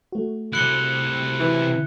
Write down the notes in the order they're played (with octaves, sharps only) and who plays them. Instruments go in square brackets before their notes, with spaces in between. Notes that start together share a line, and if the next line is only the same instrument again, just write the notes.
[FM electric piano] A3 F#4
[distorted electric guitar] C3 E4 [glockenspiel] F#6 C#7 G7
[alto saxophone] E3